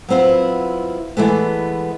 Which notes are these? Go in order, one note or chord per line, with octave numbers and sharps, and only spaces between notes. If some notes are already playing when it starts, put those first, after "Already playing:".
F#3 B3 C4 E4 F4
E3 G#3 A3 B3